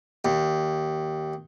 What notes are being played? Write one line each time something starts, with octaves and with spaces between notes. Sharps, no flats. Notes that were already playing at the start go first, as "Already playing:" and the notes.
D#2